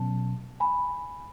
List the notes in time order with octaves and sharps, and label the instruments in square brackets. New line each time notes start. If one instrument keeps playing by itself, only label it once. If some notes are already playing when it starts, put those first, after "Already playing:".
Already playing: [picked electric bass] B2 F#3 C#4 [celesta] A5
[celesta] G#5 B5